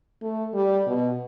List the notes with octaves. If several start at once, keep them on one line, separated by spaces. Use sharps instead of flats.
A3
G3
B2